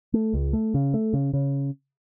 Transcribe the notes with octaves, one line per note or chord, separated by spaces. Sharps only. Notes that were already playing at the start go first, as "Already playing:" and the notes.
A3
C#2
A3
C#3
A3
C#3
C#3